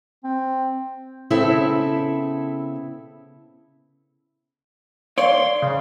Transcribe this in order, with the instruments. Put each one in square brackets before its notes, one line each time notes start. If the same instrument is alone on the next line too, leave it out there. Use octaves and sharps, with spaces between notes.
[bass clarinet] C4
[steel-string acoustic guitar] C#3 B3 C4 E4 A4
[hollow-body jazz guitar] C#5 D5 [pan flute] F5 [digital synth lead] C6
[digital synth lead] C#3